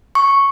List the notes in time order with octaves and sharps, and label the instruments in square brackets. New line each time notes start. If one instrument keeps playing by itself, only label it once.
[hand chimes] C#6